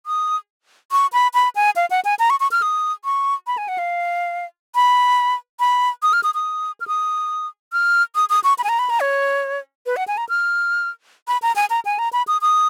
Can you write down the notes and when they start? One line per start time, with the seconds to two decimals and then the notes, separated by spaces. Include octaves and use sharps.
0.06 D#6
0.92 C#6
1.13 B5
1.34 B5
1.56 G#5
1.76 F5
1.90 F#5
2.05 G#5
2.19 A#5
2.30 C#6
2.40 C#6
2.51 F6
2.62 D#6
3.05 C#6
3.47 B5
3.58 G#5
3.68 F#5
3.78 F5
4.75 B5
5.60 B5
6.02 D#6
6.13 F6
6.23 D#6
6.35 D#6
6.81 F6
6.88 D#6
7.73 F6
8.15 D#6
8.30 D#6
8.44 C#6
8.58 B5
8.64 G#5
8.69 A#5
8.79 B5
8.90 A#5
9.00 C#5
9.86 B4
9.96 F#5
10.08 G#5
10.17 A#5
10.29 F6
11.28 B5
11.42 A#5
11.56 G#5
11.70 A#5
11.85 G#5
11.99 A#5
12.13 B5
12.28 D#6
12.41 D#6